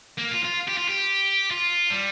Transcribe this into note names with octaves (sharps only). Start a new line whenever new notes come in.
A#3
F4
F4
G4
F4
G4
F4
G3